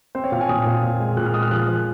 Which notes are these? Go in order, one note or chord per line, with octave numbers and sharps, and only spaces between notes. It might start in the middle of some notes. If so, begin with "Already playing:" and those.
C4 C5
C#5
A#2 F5
G#5
A#2 D#6
A#2
A#2
G#3
A#2 F#6
F6
G#3 D#6
F6
F3 F#6
F3